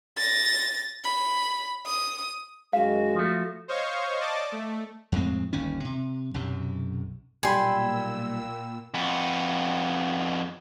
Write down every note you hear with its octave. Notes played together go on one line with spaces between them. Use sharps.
A6 A#6
B5
D#6
F#2 D#3 G#3 F#4 F5
F3 A3
C5 C#5 D#5 F5 C#6
D5 D#5 A5 D6
A3
F2 A2 G#3 C4
G1 D#2 C#4
C3
B1 F#2 C3
B1 A#2 G3 G5 G#5 B5 C6 E6
F2 B3